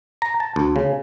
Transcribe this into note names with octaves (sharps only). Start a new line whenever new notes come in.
A#5
A5
D2
C#3